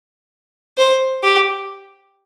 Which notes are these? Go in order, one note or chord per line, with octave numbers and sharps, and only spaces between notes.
C5
G4